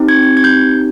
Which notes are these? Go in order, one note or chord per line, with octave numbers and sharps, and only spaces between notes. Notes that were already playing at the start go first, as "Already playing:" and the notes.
Already playing: C4 D#4 G4
G#6
G#6
G#6
G6